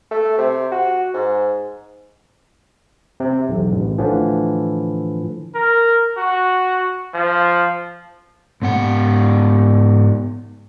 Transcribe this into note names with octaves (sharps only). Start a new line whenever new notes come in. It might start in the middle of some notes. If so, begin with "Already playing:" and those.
A3
C3
F#4
G#2
C3
B1 E2
A1
A2 D3 E3 F3
A#4
F#4
F3
G#2 B3 F#5